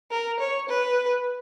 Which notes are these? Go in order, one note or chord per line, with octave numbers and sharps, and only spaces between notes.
A#4
C#5
B4